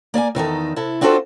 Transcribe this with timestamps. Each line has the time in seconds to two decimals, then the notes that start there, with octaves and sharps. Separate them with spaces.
0.14 A#3 D5 E5 G#5
0.35 E2 D#3 D#4 A4
0.76 C3 E4 A4
1.01 C4 D4 F4 F#4 A4 C5